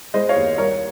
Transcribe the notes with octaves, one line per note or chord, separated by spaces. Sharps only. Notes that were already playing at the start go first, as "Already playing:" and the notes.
G#3 C5 D#5
C#5 F5
D#2
C2 A#4 C#5